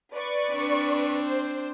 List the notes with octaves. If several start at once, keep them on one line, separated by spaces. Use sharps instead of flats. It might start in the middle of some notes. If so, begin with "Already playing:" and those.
B4 D5 C#6
C4 D4
C5